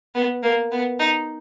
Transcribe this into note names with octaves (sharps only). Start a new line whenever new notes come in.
B3
A#3
B3
D#4